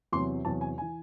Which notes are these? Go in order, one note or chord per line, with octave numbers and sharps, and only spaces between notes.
E2 C3 F#3 C6
E2 C3 F#3 A5
G#5
E3 G#5